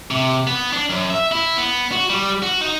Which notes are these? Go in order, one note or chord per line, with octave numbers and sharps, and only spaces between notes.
C3
B3
D4
F#2
E5
E4
B3
F#4
G3
F#4
D#4